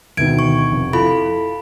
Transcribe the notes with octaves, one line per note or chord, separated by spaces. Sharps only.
D2 B2 D#3 G#6 D7
C#6
F1
E4 F4 A4 B5